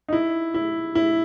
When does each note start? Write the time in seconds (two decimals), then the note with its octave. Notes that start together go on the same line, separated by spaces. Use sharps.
0.08 D#4
0.13 E4
0.54 E4
0.95 E4